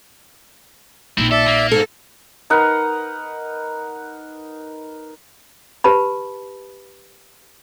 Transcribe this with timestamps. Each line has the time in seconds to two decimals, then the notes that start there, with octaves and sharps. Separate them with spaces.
1.18 A#1 C4 D#4 E4
1.31 A4 D5 E5
1.47 A#3
1.71 G#2 A4
2.50 D#4 A#4 B4 F#5
5.84 G4 B4 A5 B5